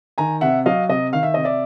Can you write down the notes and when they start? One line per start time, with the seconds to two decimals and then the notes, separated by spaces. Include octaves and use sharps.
0.18 D#3 G#5 A#5
0.41 C3 E5 F#5
0.66 F#3 D#5 F5
0.89 C3 D#5
1.13 D#3 F5
1.23 E5
1.34 C3 D#5
1.44 D5 E5